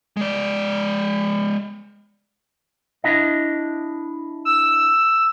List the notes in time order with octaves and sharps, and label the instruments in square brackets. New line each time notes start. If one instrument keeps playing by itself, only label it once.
[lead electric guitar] G#3 D5
[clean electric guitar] D4 E4 D#5
[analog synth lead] E6